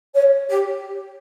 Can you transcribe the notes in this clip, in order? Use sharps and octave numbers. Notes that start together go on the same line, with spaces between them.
C#5
G4